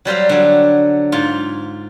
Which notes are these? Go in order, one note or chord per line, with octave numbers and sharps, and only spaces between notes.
F#3 G3 C5 F5
D3 F#3
G#2 F4